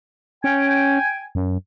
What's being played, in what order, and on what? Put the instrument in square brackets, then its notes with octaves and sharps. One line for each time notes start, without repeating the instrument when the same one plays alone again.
[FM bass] C#4 [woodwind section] G5 G#5
[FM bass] F#2